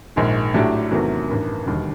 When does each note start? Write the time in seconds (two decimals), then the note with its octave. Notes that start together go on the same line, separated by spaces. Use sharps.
0.16 A#1 G#2 D#3 G#3
0.54 A2 F#3 A3 D4 G4
0.91 E2 C3 D#3 F#3 A3
1.28 A1 G2 D#3
1.66 E1 D#2 D3 G3